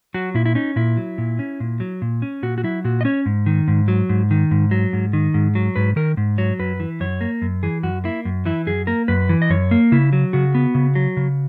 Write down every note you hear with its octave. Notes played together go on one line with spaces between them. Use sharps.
F#3 F#4
A#2 E4
E4
C#4 D#4
A#2 E4
F#3
A#2
C#4
A#2
F#3
A#2
C#4
A#2 F#4
F#4
F#3 E4
A#2 F#4
D#5
C#4 C#5
G#2
D#3
G#2
F#3
G#2
D#3
G#2
F#3
G#2
D#3
G#2
F#3
G#2 B4
D#3 A#4
G#2
F#3 C#5
F#2 B4
E3
F#2 C#5
A#3
F#2
E3 G#4
F#2 F#4
A#3 E4
F#2
E3 E4
F#2 G#4
A#3 A#4
F#2 B4
E3
D#5
F#2 C#5
A#3
C#3 E4
F#3
C#3 F#4
B3
C#3
F#3
C#3